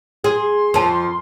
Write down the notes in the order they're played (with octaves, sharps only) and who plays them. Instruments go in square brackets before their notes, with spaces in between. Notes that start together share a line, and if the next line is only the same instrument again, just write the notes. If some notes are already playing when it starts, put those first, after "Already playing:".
[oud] G#4 [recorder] C6
[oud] F2 F3 [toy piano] A#4 A5